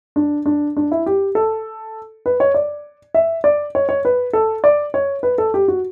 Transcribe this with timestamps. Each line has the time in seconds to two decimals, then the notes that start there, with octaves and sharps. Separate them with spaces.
0.16 D4
0.46 D4
0.77 D4
0.92 E4
1.06 G4
1.35 A4
2.26 B4
2.40 C#5
2.54 D5
3.15 E5
3.44 D5
3.75 C#5
3.89 C#5
4.05 B4
4.33 A4
4.64 D5
4.94 C#5
5.23 B4
5.38 A4
5.54 G4
5.68 F#4